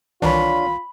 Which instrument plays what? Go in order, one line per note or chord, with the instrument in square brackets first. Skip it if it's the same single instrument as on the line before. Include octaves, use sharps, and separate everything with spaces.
[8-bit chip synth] C2 D#3 E3 [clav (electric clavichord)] D4 C#5 [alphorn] F4 [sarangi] B5